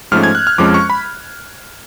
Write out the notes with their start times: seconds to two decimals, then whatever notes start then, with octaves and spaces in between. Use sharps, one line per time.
0.12 G#2 F3 A3 C#4 F6
0.23 G#6
0.35 F#6
0.47 F6
0.58 F2 F3 G#3 C#4 D6
0.74 C#6
0.90 B5